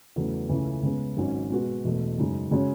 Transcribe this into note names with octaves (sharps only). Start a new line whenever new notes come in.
E2 C#3 F#3 A3
C#2 C#3 E3 A3 E4
C#3 G#3 B3
G#1 G#2 F#3 C#4
B2 G#3 B3 F#4 B4
E1 E2 B2 A3
F#2 C#3 G#3 D#4
C#3 G#3 C#4 F#4 C#5